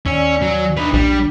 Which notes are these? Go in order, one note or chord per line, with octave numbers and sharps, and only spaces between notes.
D#2 C#4 D5 G#5 E6
F#3
D4 D#4 B4
A#1 G3